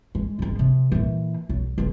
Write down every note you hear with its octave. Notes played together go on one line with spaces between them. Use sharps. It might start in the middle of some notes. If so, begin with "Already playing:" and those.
G#3
G#2 D#3
C3 F3
A#2 E3
B1
C#2 F3